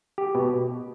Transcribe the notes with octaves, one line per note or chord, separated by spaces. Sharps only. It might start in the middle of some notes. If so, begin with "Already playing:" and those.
G4
B2